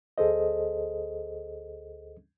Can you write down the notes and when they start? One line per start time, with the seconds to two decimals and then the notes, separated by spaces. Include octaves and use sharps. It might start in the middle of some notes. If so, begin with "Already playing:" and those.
0.18 D2 G#4 A4 C5 D#5